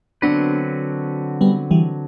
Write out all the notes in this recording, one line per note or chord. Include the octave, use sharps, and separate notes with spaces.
D3 F#3 B3 C4 D4 F#4 B4
G3 B3
E3 G3